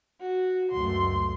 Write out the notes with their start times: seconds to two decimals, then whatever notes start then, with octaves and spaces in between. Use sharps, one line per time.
0.20 F#4
0.72 C#2 F#2 A3 C6